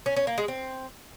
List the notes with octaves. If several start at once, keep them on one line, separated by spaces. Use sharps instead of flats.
C#4
C#4
A#3
G#3
C4